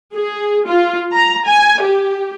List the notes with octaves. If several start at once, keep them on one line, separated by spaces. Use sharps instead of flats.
G#4
F4
A#5
G#5
G4